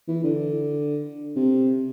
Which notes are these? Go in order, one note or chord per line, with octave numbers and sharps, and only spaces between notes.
E3
D3
C3